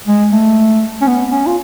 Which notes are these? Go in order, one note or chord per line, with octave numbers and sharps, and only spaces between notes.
G#3
A3
C#4
B3
C#4
F4